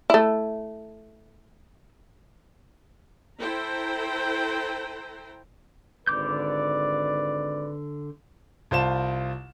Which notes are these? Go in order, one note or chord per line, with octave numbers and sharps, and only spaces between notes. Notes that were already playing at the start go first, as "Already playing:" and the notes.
A3 E4
E4 A4 C5 G5 A#5
G#1 D3 B4 D5 D6 G6
C2 F4 C5 A5 E7